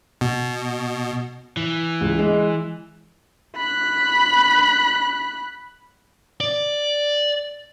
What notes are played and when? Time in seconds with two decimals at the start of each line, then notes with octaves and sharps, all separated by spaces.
0.21 B2
1.57 E3
2.01 C#2
2.19 G#3
3.56 B5 F#6
6.41 D5